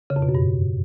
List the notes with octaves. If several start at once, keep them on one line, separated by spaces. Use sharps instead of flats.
C#3
F2
B2
F#2
G2